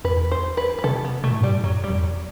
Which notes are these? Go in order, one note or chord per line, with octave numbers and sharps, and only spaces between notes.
E2 B4
C5
B4
B4
C3 A4
B3
B2 A3
A2
G2
G3
A2
F#2 F#3
G3
E2
F#3